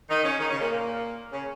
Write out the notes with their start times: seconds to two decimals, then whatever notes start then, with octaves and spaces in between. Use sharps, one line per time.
0.09 D#3 D#4
0.24 C#3 C#4
0.39 D#3 D#4
0.49 C#3 C#4
0.60 A#2 A#3
0.71 A#2 A#3
1.32 C#3 C#4